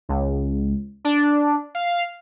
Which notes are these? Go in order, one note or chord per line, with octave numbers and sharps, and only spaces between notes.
C#2
D4
F5